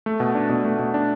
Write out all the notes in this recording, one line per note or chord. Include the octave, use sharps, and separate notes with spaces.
A3
B2
D4
B2
A3
B2
D4